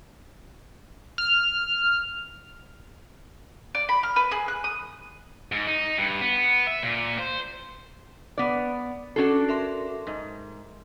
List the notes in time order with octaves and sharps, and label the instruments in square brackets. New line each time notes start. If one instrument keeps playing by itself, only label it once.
[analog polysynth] F6
[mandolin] D5
B5
F6
B4
G#4
F#6
D#6
[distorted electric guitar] G#2
D#4
G2
B3
E5
A#2
C5
[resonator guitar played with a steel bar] B3 D5
[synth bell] C#4 C7 [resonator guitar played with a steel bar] D4 F#4 A4
[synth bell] A#4 E5 C6
[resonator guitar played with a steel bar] G#2